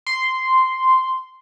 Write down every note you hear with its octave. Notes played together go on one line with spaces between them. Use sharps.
C6